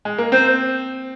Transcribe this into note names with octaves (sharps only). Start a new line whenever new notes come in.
G#3
A#3
C4 C5